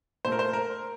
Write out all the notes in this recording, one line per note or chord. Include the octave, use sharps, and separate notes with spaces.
A#2 A3 A#4 C5
C5
A#4